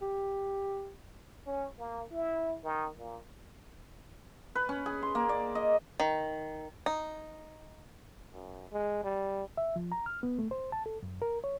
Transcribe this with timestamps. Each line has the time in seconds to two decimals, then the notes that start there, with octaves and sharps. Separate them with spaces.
0.01 G4
1.47 C#4
1.78 A#3
2.11 E4
2.64 D#3
2.97 A#2
4.55 B4
4.69 C#4
4.86 G#4
5.02 C6
5.15 A#3
5.29 D5
5.55 D#5
6.00 D#3
6.86 D#4
8.33 F#2
8.72 G#3
9.04 G3
9.57 E5
9.76 F3
9.92 A#5
10.06 F6
10.23 B3
10.39 A3
10.51 C5
10.72 A5
10.86 A4
11.03 F#2
11.22 A#4
11.44 C#5